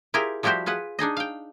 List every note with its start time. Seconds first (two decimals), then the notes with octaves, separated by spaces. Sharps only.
0.14 E4 F4 G4 G#4 A#4 C5
0.43 F3 G3 E4 F#4 G4 C5
0.66 F4 G#4 B4 F#5
0.99 D4 D#4 G#4 D#5
1.17 F5 G5